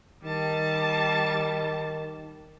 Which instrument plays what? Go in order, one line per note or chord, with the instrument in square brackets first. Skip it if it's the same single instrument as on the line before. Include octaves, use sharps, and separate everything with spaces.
[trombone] D#3 [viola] G3 A5